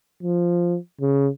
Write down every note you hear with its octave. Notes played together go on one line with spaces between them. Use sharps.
F3
C#3